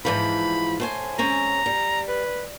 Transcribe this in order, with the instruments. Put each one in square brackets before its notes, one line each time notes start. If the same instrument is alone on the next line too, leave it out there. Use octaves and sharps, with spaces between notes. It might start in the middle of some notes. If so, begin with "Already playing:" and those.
[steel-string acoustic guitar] G#2 E3 F3 [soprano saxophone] B5
[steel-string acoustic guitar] A2 C5 G#5
[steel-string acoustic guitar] G#3 C4 C#4 [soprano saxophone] A#5
[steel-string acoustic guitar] G3
[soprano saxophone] B4